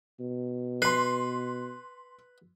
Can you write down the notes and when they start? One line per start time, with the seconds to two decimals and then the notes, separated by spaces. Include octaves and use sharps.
0.20 B2
0.82 B4 C6 C7